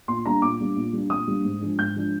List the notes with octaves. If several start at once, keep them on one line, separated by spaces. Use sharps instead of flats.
A#2 C6
G3 A#3 D4 A#5
A#2 D6
G3 A#3 D4
A#2
G3 A#3 D4
A#2 D#6
G3 A#3 D4
G#2
F3 G#3 D4
G#2 G6
F3 G#3 D4